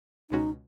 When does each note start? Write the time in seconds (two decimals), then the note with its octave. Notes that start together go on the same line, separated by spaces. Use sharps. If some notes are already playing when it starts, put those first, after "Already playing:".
0.30 C#2 B2 G#3 C#4 D#4 F#4